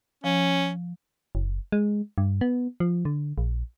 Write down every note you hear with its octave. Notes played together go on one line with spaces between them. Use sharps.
F3 C#4
F#1
G#3
G2
B3
F3
D3
A#1